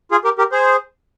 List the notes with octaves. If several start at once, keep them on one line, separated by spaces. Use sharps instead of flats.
F4 G#4
G4 A#4
G4 A#4
G#4 C5